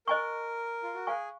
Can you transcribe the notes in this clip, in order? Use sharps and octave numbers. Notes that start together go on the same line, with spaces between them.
A#4 C5 D#5 G#5 C#6
F4
F#4
G#4 C5 F5 G#5 C#6